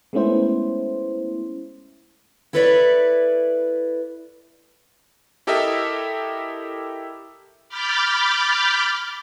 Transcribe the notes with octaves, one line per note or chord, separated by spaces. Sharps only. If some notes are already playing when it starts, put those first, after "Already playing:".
G#3 A3 B3 C#4 E4 C5
E4 A4 B4 C#5 D5 E5
E4 G4 A4 A#4 D#5 E5
B5 D6 F6 G6 A6